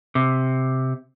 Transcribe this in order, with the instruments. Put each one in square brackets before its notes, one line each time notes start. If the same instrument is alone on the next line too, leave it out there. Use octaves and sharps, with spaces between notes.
[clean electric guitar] C3